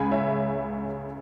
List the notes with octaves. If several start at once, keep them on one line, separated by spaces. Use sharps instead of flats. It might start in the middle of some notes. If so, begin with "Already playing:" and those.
Already playing: C#2 C#3 G#3 G#5 B5
C#5 E5